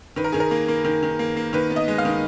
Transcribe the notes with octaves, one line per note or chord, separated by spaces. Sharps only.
D#3 B4
A#4
D#3 G#4
A#4
A#3
A#3
D#3
D#3
A#3
A#3
D#3 B4
B3
D#5
G#3
F5
D#3